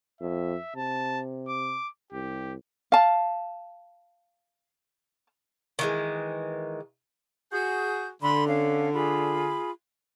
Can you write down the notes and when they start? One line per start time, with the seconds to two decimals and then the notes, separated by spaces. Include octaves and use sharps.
0.21 F2 E5
0.76 C3 A5
1.49 D6
2.13 C2 G4
2.92 F5 A5
5.79 D#3 E3 G#3
7.52 F#4 G#4 G6
8.22 D3 B5 C6
8.48 C#4 F5
8.94 F4 G#4 B5